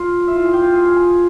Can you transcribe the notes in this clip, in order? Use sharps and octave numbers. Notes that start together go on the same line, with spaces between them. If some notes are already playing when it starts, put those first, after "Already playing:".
Already playing: F4 F5
E4 E5
F4 F5
G#4 G#5
G4 G5
F4 F5
G#4 G#5
G#4 G#5
G#4 G#5